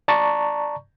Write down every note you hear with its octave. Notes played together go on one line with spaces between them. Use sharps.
D5 A5 A#5 C#6